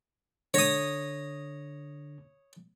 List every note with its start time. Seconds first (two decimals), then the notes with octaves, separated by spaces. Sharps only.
0.54 D3 C#5 D#6 A#6